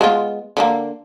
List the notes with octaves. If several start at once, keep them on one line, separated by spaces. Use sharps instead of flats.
G#3 B3 F4
D3 F3 A#3